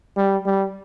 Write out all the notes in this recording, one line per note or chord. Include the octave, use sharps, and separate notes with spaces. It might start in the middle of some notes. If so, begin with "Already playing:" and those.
G3
G3